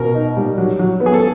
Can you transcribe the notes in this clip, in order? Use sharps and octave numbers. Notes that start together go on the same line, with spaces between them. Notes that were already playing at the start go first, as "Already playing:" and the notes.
Already playing: B2 A#4
D#4
G3
F#3
F#3
B3
G#4
A4